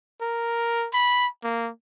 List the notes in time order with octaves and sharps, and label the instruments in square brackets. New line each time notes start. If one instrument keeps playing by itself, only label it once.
[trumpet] A#4
B5
A#3